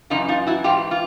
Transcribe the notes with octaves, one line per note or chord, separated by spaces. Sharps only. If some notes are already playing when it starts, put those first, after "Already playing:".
F#2 C#3 E3 D#4 F4
D#4 F4
E4 F#4
G#2 E3 F4 G4
F4